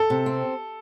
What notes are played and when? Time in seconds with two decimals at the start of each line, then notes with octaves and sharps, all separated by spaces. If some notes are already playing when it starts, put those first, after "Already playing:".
Already playing: A4
0.10 C3
0.26 C4